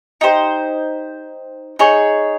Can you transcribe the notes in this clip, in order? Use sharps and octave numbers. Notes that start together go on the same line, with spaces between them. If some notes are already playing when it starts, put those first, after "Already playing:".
D#4 G4 C5
D#4 G#4 C#5